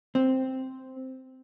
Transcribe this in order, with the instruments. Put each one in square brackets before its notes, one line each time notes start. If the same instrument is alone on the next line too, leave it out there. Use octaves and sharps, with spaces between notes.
[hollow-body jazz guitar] C4